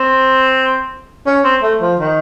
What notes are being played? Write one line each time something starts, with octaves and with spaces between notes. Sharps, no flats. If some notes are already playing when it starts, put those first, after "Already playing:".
Already playing: C4
C#4
C4
A3
F3
D#3